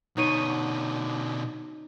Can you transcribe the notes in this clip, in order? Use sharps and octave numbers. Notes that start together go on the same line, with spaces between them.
B2 D3 D#4 C#5 D#7